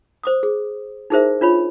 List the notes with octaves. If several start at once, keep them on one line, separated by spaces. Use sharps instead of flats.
C5 D6 D#6
G#4
D#4 E4 G#4 A#4 C5 E5
D4 F4 C#5 B5